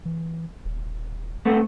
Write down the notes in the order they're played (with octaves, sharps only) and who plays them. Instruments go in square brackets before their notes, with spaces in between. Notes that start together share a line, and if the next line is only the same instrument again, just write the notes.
[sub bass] E3
D#1
[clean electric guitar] A3 B3 C4